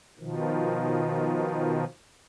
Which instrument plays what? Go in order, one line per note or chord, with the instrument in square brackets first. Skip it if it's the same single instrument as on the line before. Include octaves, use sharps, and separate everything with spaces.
[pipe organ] B2 D#3 F3